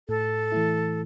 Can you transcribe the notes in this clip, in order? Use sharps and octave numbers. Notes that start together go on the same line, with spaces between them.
A2 A4
E3 A3 E4